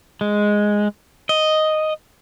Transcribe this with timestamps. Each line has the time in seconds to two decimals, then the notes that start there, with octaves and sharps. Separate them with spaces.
0.21 G#3
1.29 D#5